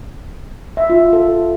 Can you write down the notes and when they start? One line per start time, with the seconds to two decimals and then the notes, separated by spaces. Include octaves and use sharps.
0.77 E5
0.90 F4
1.13 A4